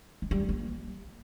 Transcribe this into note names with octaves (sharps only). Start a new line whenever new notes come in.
G#3
G3
D3
A#3